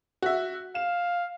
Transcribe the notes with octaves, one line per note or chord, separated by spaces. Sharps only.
F#4 E5
F5 E7